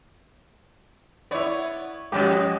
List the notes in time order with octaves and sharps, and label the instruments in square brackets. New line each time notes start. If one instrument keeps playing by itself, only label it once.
[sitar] B3 C#5 [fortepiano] E4 D5
[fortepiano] G#2 G4 [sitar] B2 F3 C#4